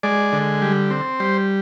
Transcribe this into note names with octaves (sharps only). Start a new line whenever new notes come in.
G#3 D5
D3
G3
C4
G3 C5